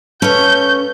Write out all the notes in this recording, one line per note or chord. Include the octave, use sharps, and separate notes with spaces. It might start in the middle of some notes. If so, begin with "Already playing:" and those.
C#4 A4 B4 C#5 F5 G6